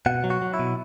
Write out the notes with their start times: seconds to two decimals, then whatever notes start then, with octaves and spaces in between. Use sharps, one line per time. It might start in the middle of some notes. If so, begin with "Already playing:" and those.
0.06 B2 F#5
0.24 F#3
0.30 F#4
0.42 F#3
0.54 E4
0.59 B2